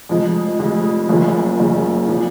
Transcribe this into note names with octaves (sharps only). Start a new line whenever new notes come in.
F1 F2 F3 G#3
F1 F2 F3 G#3
F#1 F#2 C#3 F3
F#1 F#2 C#3 F3
A#2 F3